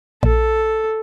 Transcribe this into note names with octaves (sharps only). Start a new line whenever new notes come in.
A#1 A4